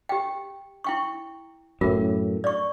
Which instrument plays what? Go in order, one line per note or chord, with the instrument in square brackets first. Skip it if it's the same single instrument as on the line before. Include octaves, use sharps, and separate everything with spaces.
[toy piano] G4 G5
E4 G5 C#6
[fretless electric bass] F#2 A2 [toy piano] F4 A#4
[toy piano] D5 C#6